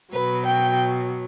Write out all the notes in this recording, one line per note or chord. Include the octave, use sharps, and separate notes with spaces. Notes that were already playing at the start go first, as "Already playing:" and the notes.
B2 F#3 B4
G5